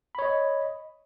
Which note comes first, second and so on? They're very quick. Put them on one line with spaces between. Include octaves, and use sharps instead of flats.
B5 C#5 D#5